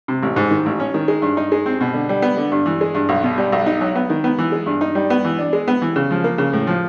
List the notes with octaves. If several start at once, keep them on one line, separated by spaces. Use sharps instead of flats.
C3
A1
G#2
D#3
A1
C#4
D#3
G#3
G2
D#4
G#3
C4
B2
D3
G3
B3
D3
G2
E3
G#3
G2
B1
B2
G3
B1
D#4
F#3
B3
D#3
B3
E3
G#3
G2
D#4
G3
B3
E3
D4
G#3
B3
E3
C#3
F3
A#3
C#3
A2
F3